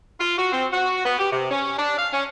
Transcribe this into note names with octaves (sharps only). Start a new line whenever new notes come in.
F4
F#4
C4
F#4
B3
G4
C3
C#4
D4
F5
C#4